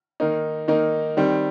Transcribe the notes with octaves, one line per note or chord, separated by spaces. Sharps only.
D#3 A#3 D#4
D#3 A#3 D#4
D#3 G3 C4